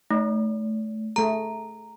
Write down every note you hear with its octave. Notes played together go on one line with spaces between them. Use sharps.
A3 D#4
A3 G#4 A#5